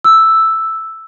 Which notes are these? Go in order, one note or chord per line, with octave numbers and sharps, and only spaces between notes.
E6